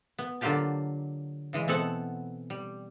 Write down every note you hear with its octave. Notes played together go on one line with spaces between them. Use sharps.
B3
D3 F#3 A#3 F4 G4 A5
C#3 E3 G#3
B2 B3 C4 A4 F#5 A5
G3